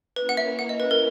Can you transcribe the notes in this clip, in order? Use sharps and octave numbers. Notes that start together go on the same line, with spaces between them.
A#3 C#4 E4 A#4 B4
F#5
E5
F#5
D#5
B4
A#4